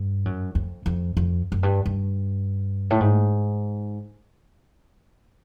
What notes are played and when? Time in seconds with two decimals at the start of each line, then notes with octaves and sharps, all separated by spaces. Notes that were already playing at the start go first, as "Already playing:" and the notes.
Already playing: G2
0.25 F#2
0.55 F2
0.86 F2
1.17 F2
1.52 F#2
1.63 G2
1.86 G2
2.90 A2
3.01 G#2